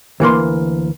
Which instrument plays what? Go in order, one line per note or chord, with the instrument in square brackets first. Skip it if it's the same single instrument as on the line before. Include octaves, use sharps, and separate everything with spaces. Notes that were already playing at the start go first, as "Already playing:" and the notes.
[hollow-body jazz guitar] D2 E3 A#3 C6